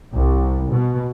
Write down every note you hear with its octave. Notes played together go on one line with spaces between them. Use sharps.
C2
B2